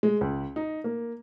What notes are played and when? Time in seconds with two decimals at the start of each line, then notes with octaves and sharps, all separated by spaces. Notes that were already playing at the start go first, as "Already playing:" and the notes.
0.03 G#3
0.21 C#2
0.56 D#4
0.84 A#3